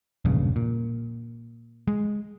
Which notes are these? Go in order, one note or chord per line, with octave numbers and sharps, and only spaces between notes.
E1 A#1 G2 C#3
A#2
G#3